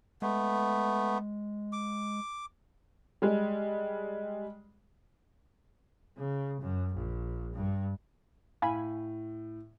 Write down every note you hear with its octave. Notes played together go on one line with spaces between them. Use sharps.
G#3 A3 B3
D6
G3 G#3
C#3
F#2
A#1
G2
A2 F5 G#5 B5